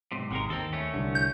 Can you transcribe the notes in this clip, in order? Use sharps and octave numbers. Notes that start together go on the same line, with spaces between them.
B1 G#2 C3
G#1 C3 G#3 A#4
D#2 C4 A4
A3 C#4
C2 D3
G6